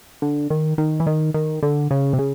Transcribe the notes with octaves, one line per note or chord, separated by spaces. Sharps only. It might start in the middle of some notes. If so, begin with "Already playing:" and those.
D3
D#3
D#3
E3
D#3
D#3
D3
C#3
C3
C#3